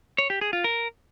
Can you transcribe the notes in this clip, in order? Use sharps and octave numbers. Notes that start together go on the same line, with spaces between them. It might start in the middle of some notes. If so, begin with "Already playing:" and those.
C#5
G4
G#4
F4
A#4